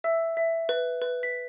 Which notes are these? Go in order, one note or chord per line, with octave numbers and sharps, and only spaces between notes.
E5 E6
E5
B4
B4
B6